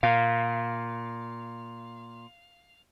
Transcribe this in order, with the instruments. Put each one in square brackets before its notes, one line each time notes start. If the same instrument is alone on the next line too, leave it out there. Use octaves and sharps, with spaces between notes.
[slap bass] A#2 [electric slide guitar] F5